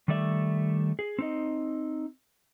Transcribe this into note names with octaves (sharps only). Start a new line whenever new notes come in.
D#3 G3 A3 D5 E5
G#4
C4 D#4 D#5